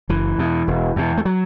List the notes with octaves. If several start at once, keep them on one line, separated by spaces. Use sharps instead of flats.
F#1 E3
E2 B2
E1
E2 B2
A3
F#3